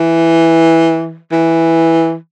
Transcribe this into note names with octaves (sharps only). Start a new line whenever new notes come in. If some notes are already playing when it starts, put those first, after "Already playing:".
Already playing: E3
E3